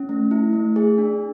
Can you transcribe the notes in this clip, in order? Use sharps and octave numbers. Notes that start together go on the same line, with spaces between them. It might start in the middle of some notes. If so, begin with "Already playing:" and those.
Already playing: C#4
A3
E4
A3
G#4
D4